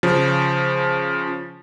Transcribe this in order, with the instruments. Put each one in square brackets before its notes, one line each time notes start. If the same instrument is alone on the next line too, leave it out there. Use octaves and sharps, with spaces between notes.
[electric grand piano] C#3 F3